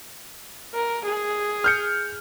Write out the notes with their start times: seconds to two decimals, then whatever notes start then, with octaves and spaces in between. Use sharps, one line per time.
0.74 A#4
1.05 G#4
1.64 F6 G6 C#7